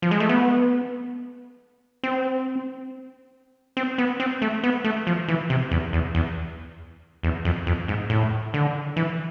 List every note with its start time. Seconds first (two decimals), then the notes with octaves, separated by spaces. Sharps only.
0.02 F3
0.11 G#3
0.20 A3
0.29 B3
2.03 C4
3.77 C4
3.98 B3
4.20 C4
4.42 A3
4.63 B3
4.84 A3
5.07 F3
5.28 E3
5.50 C3
5.71 E2
5.93 E2
6.15 E2
7.23 E2
7.45 F2
7.67 F2
7.88 G#2
8.10 A2
8.54 D3
8.96 E3